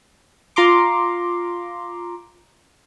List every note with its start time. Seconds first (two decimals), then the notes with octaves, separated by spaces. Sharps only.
0.56 F4 A#5 C6 D6